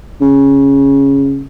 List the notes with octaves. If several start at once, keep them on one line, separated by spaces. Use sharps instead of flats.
C#3